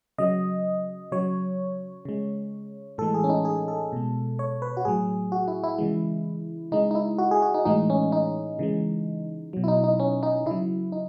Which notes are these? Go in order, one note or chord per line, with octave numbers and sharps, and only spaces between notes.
C#3 F#3 D#5
C#3 F#3 C#5
C#3 G#3
A2 E3 G#3 A4
G#4
C#4
D#4
G#4
A4
B2 G#3
C#5
B4
F#4
A2 F#3 G#4
F#4
E4
E4
C#3 E3 G#3
C#3 G#3 D#4
D#4
E4
F#4
G#4
F#4
D#4
A2 E3 G#3 D#4
C#4
D#4
C#3 E3 G#3
B2 F#3
E4
D#4
D#4
C#4
D#4
C#3 F#3 E4
D#4